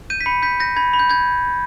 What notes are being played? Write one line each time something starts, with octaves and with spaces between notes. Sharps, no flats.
G6 D#7
B6
B5 C#7
G6 B6
G6 A#6
B5 G#6
B5
G6
G6 G#6